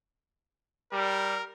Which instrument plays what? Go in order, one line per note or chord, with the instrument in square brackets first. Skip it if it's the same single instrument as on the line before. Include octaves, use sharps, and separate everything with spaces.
[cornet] G3 [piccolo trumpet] A#4